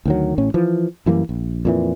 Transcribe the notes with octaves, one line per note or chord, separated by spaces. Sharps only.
D2 D#3 F#3
A1 A2 C#4
E3 F3
F#2 E3 G3 A#3
A#1
F2 A#2 E3